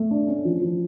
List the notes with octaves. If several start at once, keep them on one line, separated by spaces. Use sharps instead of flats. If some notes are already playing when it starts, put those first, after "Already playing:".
Already playing: A3
D4
C#4
F3
F3